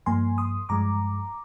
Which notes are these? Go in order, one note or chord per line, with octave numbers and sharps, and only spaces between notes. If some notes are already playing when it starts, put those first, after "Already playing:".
G2 F3 A#3 G#5 C6
C6 D#6
G2 F3 G#3 A#5 D6